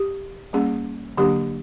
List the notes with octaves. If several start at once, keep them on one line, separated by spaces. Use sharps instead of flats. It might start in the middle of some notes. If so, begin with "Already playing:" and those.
Already playing: G4
G3 A#3 C#4 G#4
D3 F#3 A#3 D4 G4